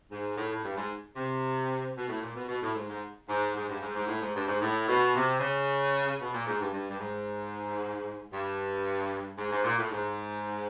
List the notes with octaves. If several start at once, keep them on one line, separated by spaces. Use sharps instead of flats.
G#2
A2
A2
G2
G#2
C3
B2
A2
A#2
B2
B2
A2
G#2
G#2
G#2
G#2
G2
G#2
G#2
A2
G#2
G2
G#2
A2
B2
C3
C#3
B2
A#2
G#2
G2
G2
G2
G#2
G2
G#2
G#2
A#2
A2
G#2